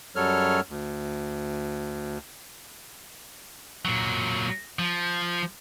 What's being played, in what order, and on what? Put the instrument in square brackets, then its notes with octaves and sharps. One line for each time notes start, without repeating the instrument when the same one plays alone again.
[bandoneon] F#2 F#3 G3 A4 C#5 F6
D2
[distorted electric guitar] A#2 F#3
F3